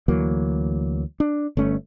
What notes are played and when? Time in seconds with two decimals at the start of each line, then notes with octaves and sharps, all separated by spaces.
0.08 D2 E3 F#3 A#3
1.20 D4
1.57 G1 A3 C#4